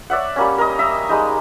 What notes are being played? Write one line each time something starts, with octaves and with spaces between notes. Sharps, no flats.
C#5 D5 E5 F#5
G3 A#3 C#4
A#4 D#5
D#5 E5 A#5
G3 G#3 D#4